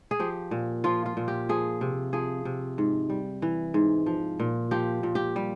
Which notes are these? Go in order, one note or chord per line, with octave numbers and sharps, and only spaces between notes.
G#4
F3 G4
A#2
F3 F4
F4
A#2
G4
F3 G#4
C3
F3 G#4
C3
G#2
G3
E3
G#2
F3
A#2
F3 G4
A#2
G4
G3